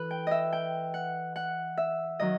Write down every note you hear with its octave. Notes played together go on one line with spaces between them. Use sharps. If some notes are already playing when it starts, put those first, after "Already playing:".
Already playing: E3 A4 B4
G5
D#5 E5
G5
F#5
F#5
E5
D#3 F#3 D#5